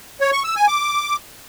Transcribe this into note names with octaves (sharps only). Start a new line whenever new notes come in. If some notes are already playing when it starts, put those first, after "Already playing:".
C#5
C#6
E6
G#5
D6